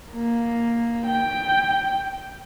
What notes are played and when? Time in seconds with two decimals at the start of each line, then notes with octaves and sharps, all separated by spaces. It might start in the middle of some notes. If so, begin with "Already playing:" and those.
0.12 A#3
1.06 G5